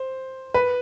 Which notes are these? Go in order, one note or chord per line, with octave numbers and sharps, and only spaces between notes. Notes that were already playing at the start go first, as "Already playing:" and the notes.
Already playing: C5
B4